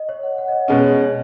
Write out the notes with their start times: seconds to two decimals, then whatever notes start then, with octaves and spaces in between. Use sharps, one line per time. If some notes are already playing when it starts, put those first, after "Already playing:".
Already playing: D#5
0.09 C#5
0.23 F#5
0.38 F#5
0.48 D#5
0.52 C#5
0.67 B2 G#3 C#4 D#5